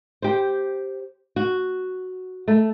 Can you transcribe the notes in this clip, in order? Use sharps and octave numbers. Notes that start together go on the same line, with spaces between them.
G4 C5
F#4
A3